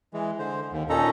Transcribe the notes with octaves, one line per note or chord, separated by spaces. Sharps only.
E3 G#3
D3 C5
D#2
A#2 C#4 D#4 A4 A#5